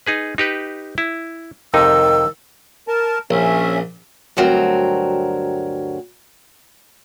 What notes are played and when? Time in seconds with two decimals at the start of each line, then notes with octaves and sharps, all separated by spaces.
0.06 D#4 G#4 B4
0.38 D#4 G4 B4
0.98 E4
1.74 F2 C3 D#3 D#4 E6
2.88 A#4 A5
3.31 A#1 C#4 E5
4.37 D2 G2 F#3 C4 A#4